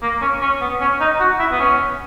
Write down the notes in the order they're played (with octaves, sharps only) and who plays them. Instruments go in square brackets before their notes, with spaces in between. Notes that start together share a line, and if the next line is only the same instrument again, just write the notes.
[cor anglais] A#3
C#4
C#4
B3
C#4
D#4
F#4
E4
B3
C#4